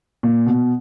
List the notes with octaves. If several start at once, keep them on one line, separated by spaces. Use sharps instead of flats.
A#2
B2